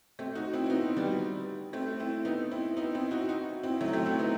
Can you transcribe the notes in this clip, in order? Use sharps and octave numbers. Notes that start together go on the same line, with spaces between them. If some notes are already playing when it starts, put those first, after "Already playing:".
A3 C4
D#4 F#4
C4 E4
C4
B3 D#4
G3 B3
A3 C4
C4 E4
B3 D#4
C4 E4
B3 D#4
C4 E4
D#4 F#4
D#4 F#4
C4 E4
F#3 A3
A3 C4
C4 E4
B3 D#4